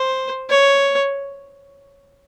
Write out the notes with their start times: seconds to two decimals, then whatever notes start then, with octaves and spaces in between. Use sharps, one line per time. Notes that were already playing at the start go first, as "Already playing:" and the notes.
Already playing: C5
0.50 C#5